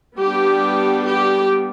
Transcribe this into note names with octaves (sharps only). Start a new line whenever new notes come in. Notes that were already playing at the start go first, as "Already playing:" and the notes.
G3 B3 D4 G4
G4